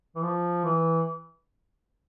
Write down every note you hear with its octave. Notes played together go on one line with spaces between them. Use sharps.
E3
F3
E3